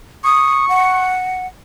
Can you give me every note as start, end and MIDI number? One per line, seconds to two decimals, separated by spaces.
0.24 1.11 85
0.24 0.65 87
0.69 1.47 78